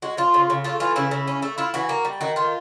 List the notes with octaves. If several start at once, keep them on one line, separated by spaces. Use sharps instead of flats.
G#3 F#4
F3 F4
C#3
C#3
A3 F4
E3 F4
C#3 E4
C#3
C#4
A3
E4 F4
E3 F#4
A#3
G3
D#3 F#4
D#3 F4